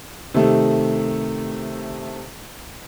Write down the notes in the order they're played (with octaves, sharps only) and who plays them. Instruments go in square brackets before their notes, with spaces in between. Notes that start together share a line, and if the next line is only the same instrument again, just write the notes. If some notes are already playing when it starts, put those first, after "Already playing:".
[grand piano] C3 D#3 A3